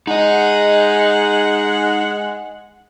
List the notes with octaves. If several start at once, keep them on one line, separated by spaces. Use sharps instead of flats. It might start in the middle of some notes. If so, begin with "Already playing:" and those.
G#3 D#4 D#5 F#5